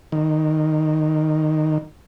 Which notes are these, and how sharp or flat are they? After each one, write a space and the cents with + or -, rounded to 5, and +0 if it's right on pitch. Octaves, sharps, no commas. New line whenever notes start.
D#3 -5